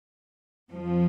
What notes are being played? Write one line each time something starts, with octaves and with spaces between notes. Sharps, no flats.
F2 F3